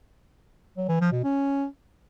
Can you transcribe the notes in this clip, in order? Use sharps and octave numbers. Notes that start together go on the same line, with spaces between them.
F#3
E3
F3
B2
C#4